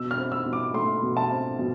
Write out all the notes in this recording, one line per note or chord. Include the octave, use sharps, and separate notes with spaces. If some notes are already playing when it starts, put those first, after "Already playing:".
Already playing: B2 E6
F6
C4
E6
B2
D6
A3 C6
B2
A5
C4
B2